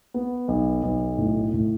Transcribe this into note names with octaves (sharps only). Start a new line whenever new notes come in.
B3
B1
B1
A2
A2